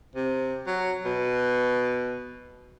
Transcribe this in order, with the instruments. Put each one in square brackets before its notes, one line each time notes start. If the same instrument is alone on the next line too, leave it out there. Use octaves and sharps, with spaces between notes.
[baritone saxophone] C3
F#3
B2